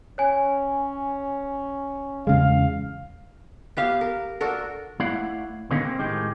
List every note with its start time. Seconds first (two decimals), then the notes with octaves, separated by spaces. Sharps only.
0.18 C#4 C#5 G#5
2.27 E2 C#3 G#3 F5
3.77 B3 G4 F5
4.01 A#4
4.41 D4 F#4 A4 A#4
5.00 A3 E4 D5 F5 F#5
5.71 B2 D3 D#3 G#3 A#3 C#4
5.85 C4
5.99 A2 D#3 G#3 G4